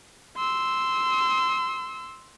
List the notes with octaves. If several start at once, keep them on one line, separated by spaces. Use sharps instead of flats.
C6 E6